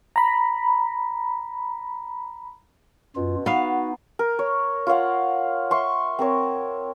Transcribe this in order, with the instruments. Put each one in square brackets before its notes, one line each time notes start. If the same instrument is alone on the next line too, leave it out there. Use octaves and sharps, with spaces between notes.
[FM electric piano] A#5 B5
[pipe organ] F#2 F4 [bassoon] B2
[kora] B3 F5 [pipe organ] D#4 [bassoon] F#4
[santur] A#4
C#5
F4 C#5 F5 F#5
E5 C6 C#6
C4 A#4 C#5